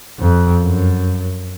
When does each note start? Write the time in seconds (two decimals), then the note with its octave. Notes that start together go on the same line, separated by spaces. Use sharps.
0.19 F2
0.62 F#2